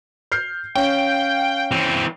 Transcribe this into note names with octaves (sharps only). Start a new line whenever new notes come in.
F6 G6 C7
C#4 F5 G5
E3 C4